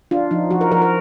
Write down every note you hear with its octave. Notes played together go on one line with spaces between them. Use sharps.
D4 F4
F3 D#4
F3 F#4
A#4
F3 A#4
A#4